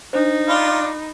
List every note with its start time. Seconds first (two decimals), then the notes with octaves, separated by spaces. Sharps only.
0.13 D4 D#4 C5
0.49 D4 F4 B5